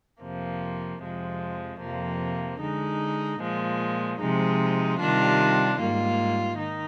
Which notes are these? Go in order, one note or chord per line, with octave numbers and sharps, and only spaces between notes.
F2 C3 F3 A#3
F2 C3 F3 G#3
F2 C3 F3 A#3
D3 G#3 D#4
A#2 F3 G#3
C3 F3 G#3 D#4
C3 D#3 G3 D4 F4
G#2 G3 A#3 F4
D#3 D#4